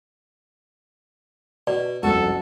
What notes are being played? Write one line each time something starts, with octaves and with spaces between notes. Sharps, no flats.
B2 D5
F#1 C2 F2 F#4 A4